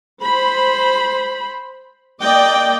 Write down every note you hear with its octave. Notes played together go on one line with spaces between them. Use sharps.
C5 B5
A#3 D5 D#5 G5